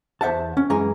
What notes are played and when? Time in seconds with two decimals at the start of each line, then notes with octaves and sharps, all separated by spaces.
0.21 E2 C5 E5 F#5 A5
0.57 C#4
0.70 F#2 E3 G#3 G#5 A#5